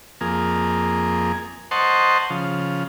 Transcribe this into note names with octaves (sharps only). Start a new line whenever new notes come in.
F2 A#3 G#4
C5 D#5 F#5 A5 C6 C#6
C#3 F3